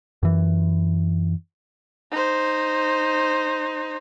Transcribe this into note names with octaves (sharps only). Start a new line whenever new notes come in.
F#2 E3
D#4 C5